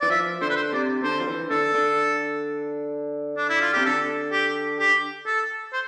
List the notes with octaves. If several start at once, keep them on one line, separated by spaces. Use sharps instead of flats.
E3 D5
F3 E5
D3 C5
B4
C5
C3 D5
D3 C5
F3
E3
D3 A4
D3
D4
E4
F4
C3 G4
D3 A4
G4
G4
A4
C5